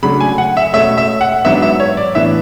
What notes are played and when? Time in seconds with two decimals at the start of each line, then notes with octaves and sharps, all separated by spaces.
0.02 C#3 F#3 A3 D4 B5
0.21 G#5
0.38 F#5
0.57 E5
0.73 B2 A3 C#4 E5
0.98 E5
1.21 F#5
1.45 G#2 F#3 B3 D4 E5
1.62 E5
1.80 C#5
1.97 D5
2.15 A2 E3 B3 D4 E5